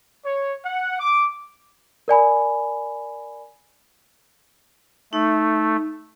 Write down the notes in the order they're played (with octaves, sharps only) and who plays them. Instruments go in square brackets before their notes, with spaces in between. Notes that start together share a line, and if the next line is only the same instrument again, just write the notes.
[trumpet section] C#5
F#5
D6
[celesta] A#4 D5 G#5 B5
[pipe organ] A3 [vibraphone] D#4